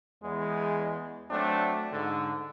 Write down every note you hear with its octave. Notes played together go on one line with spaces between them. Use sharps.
E2 G#3
F#3 A3 C4 D4
G#2 D3